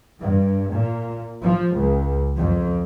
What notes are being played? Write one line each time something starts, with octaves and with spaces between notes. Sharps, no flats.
G2
A#2
F3
C#2
F2